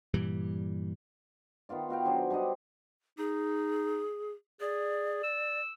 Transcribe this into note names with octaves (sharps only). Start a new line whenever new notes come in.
G2 A#2 E3 G3
D#3 B3 F4 D5
B3 F#4 F5 G5
F#3 D4 G#4 C5
G3 D4 C5 D#5
D#4 G#4
G#4 D5
E6